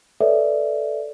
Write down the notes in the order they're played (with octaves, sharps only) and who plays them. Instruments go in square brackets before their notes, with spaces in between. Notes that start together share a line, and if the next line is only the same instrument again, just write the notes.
[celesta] A4 B4 C#5 D5 E5